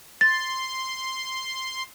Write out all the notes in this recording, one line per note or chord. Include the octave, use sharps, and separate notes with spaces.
C6 A6